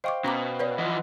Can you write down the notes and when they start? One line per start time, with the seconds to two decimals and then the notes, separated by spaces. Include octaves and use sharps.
0.04 C5 D#5 F5 G5 C#6 D6
0.24 B2 C#4 A#5 D6
0.60 B4 C#5 D5
0.78 E3 F3 D#5 F#5